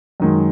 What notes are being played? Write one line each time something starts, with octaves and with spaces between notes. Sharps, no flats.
F#2 D#3 G#3